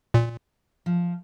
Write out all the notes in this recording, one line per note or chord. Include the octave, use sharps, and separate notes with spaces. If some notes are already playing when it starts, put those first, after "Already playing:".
A#2
F3